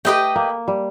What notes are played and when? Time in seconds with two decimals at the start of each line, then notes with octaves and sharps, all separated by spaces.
0.05 A3 G4 B4 D#5 G5
0.36 A#3
0.68 G3